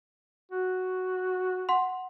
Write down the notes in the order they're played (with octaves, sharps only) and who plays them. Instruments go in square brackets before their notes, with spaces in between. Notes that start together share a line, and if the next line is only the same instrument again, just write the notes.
[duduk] F#4
[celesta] F#5 C6